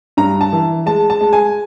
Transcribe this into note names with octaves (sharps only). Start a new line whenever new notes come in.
G2 A#5
A5
E3
G#3 A5
A5
G#3
G#5